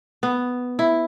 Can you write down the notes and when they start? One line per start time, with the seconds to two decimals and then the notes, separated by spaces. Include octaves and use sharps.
0.23 B3
0.79 E4